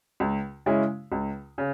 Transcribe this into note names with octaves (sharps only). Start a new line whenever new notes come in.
C#2
C#3 G#3 C#4 E4
C#2
C#3